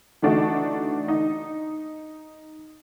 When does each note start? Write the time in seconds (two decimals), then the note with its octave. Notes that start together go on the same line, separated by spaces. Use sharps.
0.22 E3 A3 D4 D#4 F#4
1.08 D#4